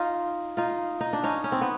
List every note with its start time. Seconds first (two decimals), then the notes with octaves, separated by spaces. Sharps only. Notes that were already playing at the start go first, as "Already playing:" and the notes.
Already playing: D#4 F4
0.57 D#4 F4
1.01 D#4
1.13 D4
1.23 C#4 D#4
1.44 C#4
1.52 C4
1.61 B3